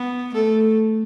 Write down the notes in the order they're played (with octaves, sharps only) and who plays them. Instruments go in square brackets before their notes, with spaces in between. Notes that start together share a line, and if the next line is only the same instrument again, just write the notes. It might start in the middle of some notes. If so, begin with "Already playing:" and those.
Already playing: [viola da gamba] B3
[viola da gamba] A3 [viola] A4